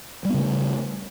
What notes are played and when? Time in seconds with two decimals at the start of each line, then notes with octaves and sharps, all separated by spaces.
0.25 G3
0.29 B3
0.34 C#3
0.39 A3